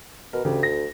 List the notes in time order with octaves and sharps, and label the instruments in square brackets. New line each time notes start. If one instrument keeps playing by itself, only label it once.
[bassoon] B2 [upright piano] A#4
[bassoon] D2 [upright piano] C#3 G4
[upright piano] A#6